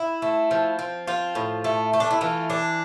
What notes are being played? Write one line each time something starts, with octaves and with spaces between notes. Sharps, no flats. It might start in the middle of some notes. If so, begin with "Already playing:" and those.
Already playing: E4
A3
F3
C4
F3 F4
A2
A3
A3
D4
E4
E3 F4
D4